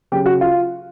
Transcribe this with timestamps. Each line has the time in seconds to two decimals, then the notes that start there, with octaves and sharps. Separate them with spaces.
0.12 C#3 F#3 G4
0.26 F#4
0.41 F4